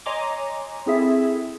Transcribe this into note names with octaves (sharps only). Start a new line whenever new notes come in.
C#5 D#5 G#5 A#5 C6 D6
C4 E4 G#4 A4 E5